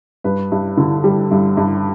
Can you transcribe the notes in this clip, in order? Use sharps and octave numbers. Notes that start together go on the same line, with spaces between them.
G2 B4
G2
D3
G3
G2
G2